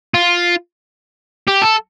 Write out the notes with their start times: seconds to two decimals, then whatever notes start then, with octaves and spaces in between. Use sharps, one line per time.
0.14 F4
1.48 G4
1.62 A4